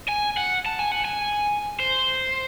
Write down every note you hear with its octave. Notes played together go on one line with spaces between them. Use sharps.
G#5
F#5
A5
G#5
F#5
G#5
C5